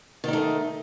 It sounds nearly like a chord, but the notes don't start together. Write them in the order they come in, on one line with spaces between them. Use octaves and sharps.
D#3 D#4 A3